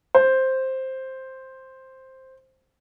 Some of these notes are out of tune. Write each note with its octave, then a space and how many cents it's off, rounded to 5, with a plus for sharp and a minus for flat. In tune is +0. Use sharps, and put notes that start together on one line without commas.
C5 +5